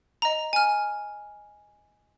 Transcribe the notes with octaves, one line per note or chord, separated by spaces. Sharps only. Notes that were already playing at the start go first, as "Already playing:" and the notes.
D#5 A#5
G#5 F6